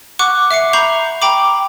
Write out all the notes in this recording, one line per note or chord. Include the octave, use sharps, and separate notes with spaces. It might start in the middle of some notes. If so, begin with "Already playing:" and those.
F#5 C#6 D6 F#6
E5 D6 C7 C#7
A#5 B5 C#6 G6 C7 F7
G5 A#5 B5 D6